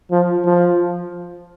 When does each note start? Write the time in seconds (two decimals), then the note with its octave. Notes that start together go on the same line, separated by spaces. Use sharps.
0.11 F3
0.45 F3